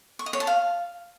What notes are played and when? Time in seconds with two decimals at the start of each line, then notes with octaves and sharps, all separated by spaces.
0.19 C#6
0.26 D#5
0.33 C#5
0.40 A5
0.47 F5